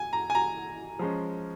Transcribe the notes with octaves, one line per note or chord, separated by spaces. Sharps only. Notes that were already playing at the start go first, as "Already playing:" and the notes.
Already playing: G#5
A#5
G#5
A#5
F3 G#3 C#4